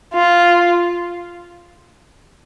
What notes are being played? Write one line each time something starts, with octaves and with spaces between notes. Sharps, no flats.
F4